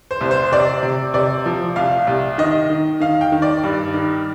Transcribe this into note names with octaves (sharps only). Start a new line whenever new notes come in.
C5
C2
C5
C3 D5
C3
C3 D5
F3
C2 F5
C2
D#3 D#5
D#3
D#3 F5
G5
D#3
D5
G2
D#3